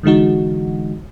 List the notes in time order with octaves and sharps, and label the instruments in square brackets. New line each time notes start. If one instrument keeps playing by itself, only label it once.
[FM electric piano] D3 E3 G#3 D#4 F#4